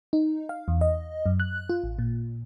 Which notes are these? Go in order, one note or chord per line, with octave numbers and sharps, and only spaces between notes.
D#4
F5
E2
D#5
F#2
F#6
F4
A1
A#2